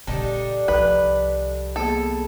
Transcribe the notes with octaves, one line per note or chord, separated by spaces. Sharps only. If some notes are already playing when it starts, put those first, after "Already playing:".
A#2 C#3 G3 D4 D#4 G4 A4 D5
C2 F3 B4
A#3 B3 G#4 A4